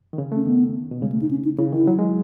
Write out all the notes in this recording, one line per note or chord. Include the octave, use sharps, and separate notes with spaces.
D#3
C#3
A3 C#4
D#3 B3
B2
C#3 G#3
A3
D#4
C#4
D#4
C#3 E4
D#3 E4
F#3
G#3